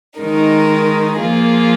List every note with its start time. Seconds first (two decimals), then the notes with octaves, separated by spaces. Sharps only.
0.19 D#3 G#3 D#4 A#4
1.18 F3 A#3 F4 G#4